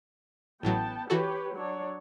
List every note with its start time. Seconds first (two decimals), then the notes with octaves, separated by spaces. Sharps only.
0.63 A1 A2 F#3 B3 G5 A5
1.10 E3 F#4 G4 A4 B4 C#5
1.55 F#3 D4 C#5